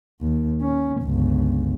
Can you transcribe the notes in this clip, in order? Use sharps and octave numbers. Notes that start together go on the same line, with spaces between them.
D#2
C#4
G1 C#2